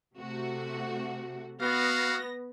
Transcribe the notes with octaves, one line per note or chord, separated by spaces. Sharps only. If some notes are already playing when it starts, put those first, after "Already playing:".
C3 A3 F#4
B3 F#4 F5 A#6